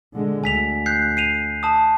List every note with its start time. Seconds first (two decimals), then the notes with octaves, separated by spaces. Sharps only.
0.13 D3 G#3
0.44 D2 G#5 B6 F7
0.86 F#6 G6 C7
1.17 C7 D#7 F7
1.63 A5 D#6